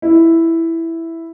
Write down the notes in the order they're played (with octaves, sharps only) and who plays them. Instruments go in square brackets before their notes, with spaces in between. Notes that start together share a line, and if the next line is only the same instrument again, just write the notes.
[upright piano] E4